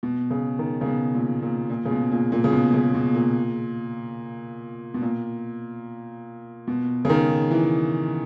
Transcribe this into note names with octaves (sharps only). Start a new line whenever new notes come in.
B2
C#3
D#3
C#3
B2
A#2
A#2
A#2
C#3
B2
A#2
A#2
C#3
B2
C#3
B2
A#2
B2
A#2
B2
C#3
D#3
E3